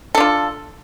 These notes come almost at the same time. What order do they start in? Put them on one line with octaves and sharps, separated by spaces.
A4 D4 F4